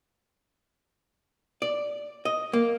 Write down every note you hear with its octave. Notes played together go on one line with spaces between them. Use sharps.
D5
D#5
A#3